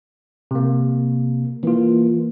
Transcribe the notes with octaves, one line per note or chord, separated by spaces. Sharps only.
C3 A#3
E3 A#3 F4